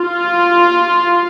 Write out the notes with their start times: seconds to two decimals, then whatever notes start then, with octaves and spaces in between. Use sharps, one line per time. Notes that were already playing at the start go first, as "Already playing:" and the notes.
Already playing: F4